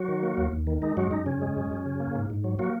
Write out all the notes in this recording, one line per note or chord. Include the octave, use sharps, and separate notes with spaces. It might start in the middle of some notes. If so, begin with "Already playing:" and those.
Already playing: F#3 F#4
D#3
A#3
D#2
D#2
D#3
G#3 D#4
F#2 F#3 F#4
F#2 D#4
C#3 C#4
G#3
F#2
F#2
C#3
A#3
G#2
G#2
F#3
F#3 A#3 F#4